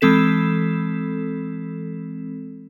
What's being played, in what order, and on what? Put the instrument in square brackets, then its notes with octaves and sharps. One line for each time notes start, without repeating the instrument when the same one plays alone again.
[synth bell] E3 G#3 C4 A4 B6 E7